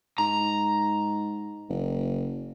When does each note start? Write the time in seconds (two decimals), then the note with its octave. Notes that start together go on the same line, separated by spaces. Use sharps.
0.18 G#2 A#5
1.69 F#1